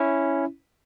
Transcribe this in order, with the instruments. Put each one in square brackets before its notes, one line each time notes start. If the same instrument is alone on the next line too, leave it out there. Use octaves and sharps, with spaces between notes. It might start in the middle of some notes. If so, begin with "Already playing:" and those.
Already playing: [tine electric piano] C#4 E4